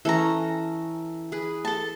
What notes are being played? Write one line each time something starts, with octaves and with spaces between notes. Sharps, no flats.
E3 C#4 A4 A#5
G#4 B4
A4 A5